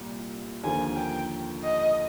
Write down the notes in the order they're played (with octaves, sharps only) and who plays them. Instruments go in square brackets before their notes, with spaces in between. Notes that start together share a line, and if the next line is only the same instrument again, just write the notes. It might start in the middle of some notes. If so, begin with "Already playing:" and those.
Already playing: [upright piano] C2 A#2 G3
[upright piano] D#2 D3 F3 A#3 [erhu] G#5
[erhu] G5
D#5